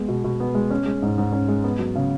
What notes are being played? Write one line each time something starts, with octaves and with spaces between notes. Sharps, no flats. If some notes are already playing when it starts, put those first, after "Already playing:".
Already playing: G#3 B3
B2
B2
B3
G#3
C#4
G#3
G#2
G#2
C#4
G#3
B3
F#3
C#3